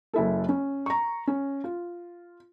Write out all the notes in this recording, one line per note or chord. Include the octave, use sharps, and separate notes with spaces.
F#1 E4 A4
C#4
A#5 C#6
C#4
F4